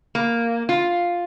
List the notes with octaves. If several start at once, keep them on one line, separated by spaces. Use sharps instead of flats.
A#3
F4